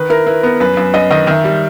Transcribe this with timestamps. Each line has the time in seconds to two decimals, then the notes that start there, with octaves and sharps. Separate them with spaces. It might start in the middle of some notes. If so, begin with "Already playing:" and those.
Already playing: D#3 B4
0.10 E4 A#4
0.26 E4 B4
0.43 B3 A#4
0.60 F#2 B4
0.77 F#2
0.94 F#2 D#5
1.10 D#3 D#5
1.27 D#3 E5
1.44 G3